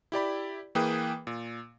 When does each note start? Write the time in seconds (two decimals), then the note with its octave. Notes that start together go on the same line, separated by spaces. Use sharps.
0.12 E4 G4 D5 B5
0.75 E3 A#3 G#4 B4 G5 D#6
1.27 A#2